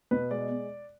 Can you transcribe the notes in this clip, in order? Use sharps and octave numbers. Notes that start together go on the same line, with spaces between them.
B2 B4
G#3 D5